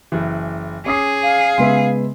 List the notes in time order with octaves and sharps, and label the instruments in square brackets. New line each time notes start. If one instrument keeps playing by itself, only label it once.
[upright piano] F#1 E3
[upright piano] C#4 [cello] G#4 [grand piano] D6 D#6 C7
[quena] F5
[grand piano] C#3 G#3 B3 [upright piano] E5 C6